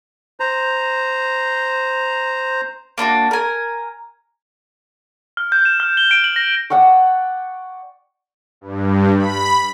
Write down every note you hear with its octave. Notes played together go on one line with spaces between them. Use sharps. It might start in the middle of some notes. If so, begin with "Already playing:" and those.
C5 A#5
A#3 D4 D#4 F#4
A#4 G#5
F6
G6
E7
F6
G7
D7
F#7
A#6
D5 F#5 G5 C#6
G2
B5